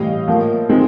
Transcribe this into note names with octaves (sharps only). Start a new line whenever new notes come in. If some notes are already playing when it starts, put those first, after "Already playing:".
Already playing: A2 E3 G3 D#5 F5
A2 F3 A#3
D#3 G#3 C4